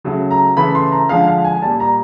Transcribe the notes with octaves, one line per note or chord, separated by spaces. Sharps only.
C#3 F#3 A3
A#5
C#3 E3 A3 B5
C6
A#5
D3 F3 G#3 F5
F5
G#5
A#2 G3 A5
A#5